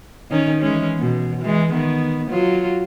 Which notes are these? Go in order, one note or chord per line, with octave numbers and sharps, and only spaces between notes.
D#3 C#4 D#4
E3 G#3 C#4
B2
E3 G#3
D#3 B3
F#3 F4